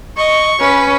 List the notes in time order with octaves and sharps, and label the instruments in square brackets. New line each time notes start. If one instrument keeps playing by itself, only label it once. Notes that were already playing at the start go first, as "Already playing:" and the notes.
[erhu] D#5 [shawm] C#6
[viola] C#4 [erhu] B4